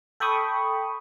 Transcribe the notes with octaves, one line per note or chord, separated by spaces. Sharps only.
A4 G5 B5 C#6 D#6